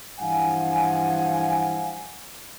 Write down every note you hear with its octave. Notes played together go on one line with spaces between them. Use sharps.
G2 E3 F3 F5 F#5 G#5